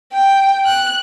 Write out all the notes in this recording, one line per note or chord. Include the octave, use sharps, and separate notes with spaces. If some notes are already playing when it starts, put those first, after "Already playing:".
G5
F#6